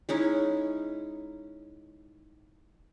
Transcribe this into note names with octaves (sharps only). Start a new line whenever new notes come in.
G#3 C#4 D#4 E4